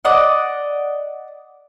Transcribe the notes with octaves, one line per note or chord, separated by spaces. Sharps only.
D5 D#5 F#5